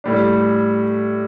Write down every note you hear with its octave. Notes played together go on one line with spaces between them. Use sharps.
A2 G3 D4